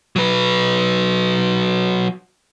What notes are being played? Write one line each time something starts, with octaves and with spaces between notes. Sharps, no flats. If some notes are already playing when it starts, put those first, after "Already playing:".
F#3 B4